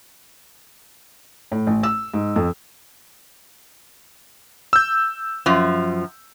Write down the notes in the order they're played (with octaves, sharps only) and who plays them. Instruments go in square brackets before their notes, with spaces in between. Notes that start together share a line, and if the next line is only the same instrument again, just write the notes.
[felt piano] A2
A1
E6
G#2
F2
[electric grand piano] E6 G6
[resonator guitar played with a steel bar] F#2 F3